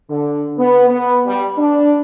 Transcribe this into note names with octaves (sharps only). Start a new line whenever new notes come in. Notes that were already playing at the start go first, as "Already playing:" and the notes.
D3
B3
B3
G3
D4